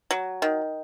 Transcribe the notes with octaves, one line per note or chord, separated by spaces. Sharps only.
F#3
D#3